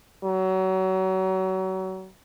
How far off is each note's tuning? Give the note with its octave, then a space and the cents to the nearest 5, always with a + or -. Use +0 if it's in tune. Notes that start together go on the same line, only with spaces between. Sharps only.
F#3 +30